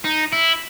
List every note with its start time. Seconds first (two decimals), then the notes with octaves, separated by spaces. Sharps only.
0.04 D#4
0.32 E4